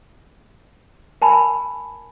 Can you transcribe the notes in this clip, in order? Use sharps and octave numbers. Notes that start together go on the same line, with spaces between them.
A#4 G#5 A5 B5